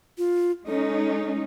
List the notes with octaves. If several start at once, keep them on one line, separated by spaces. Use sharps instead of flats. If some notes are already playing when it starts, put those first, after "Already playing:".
F4
G#3 C#4 D#4 A4